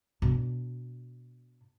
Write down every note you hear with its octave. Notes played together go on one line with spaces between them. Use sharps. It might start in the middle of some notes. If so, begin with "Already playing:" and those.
B2 D4